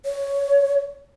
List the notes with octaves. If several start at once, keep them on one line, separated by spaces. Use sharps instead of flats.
C#5